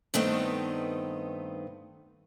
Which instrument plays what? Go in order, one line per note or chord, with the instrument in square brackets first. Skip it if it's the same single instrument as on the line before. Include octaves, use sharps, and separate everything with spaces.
[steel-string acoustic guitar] G2 D#3 A3 B3 C4 D#4